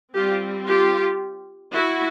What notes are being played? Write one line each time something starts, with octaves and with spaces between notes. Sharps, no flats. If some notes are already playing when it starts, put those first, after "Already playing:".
G3 C4 F4 G4
F4 G4
E4 F#4